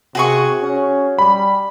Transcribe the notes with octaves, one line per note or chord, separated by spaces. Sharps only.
C3 F#4 G#4 C#6
C#4
G3 B5